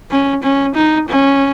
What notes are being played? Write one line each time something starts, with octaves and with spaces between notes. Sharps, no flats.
C#4
C#4
D#4
C#4